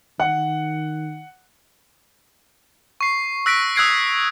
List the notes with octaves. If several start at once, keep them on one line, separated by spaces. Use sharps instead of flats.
D#3 F#5
C#6 C7
E6 F#6 A#6 B6 D7
D#6 E6 F#6 G#6 C7 D7